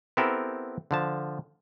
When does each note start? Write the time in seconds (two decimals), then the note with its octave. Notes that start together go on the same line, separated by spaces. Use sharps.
0.17 B3 C4 E4 G4 A4 A#4
0.91 D3 F3 A5